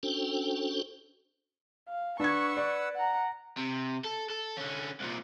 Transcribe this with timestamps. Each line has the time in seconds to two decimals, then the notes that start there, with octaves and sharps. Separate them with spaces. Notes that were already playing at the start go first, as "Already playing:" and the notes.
0.03 C#4 D4 F#4 A4 C5 G5
1.88 F5
2.20 D4 B4 F#5 C#6 E6 G#6
2.57 D5
2.96 F#5 A#5
3.57 C3
4.04 A4
4.30 A4
4.57 D3 C#4
5.00 C2 A#2